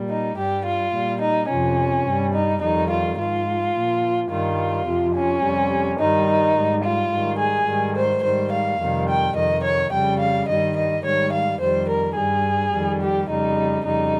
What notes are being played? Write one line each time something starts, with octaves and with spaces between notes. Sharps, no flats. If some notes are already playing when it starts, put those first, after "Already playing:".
Already playing: A#2 G3
D#4
G2 G3 G4
F4
A#2 G3
D#4
F2 C3 F3 C#4
G2 G3
D#4
F2 D#3 G3 D#4
F4
G#2 F3 F4
A#2 F3
G2 D#3 G3 F4
F2 C3 F3
C#4
F2 C3 G3
G2 D#3 G3 D#4
G#2 G3
F4
G#2 D#3 G3
G#4
G#2 D#3 G3
C5
G#2 D#3 G3 C5
F5
F2 C3 D#3 G3
G5
F2 C3 D#3 D#5
C#5
F2 C#3 G3 G5
F5
G2 D#3 G3 D#5
D#5
G#2 D#3 G3 C#5
F5
F2 D#3 G3 C5
A#4
G2 G3 G#4
F2 D#3 G3
G4
F2 C#3 G3 D#4
F2 C#3 G3 D#4